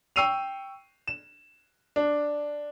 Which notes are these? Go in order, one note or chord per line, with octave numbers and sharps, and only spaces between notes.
G5 C#6 E6 C7 D#7 F7
E7
D4